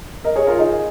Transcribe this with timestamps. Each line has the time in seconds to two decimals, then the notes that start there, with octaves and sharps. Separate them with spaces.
0.24 A#4 D#5
0.36 G#4 C#5
0.47 F4 A#4
0.59 D#4 G#4